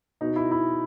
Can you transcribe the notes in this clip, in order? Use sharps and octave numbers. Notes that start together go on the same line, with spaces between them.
B2 D#4
E4
E4